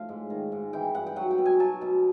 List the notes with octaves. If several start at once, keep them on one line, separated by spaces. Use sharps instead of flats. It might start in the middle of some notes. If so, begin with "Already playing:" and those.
Already playing: A2 F3 F5
G#2
D#3
G#2
E3 G5
G2 F#5
G5
F#3 F#5
G5
B2
G#5
F#3 A5
B2